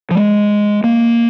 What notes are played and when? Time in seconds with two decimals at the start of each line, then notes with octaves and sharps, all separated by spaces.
0.11 F3
0.15 G#3
0.84 A#3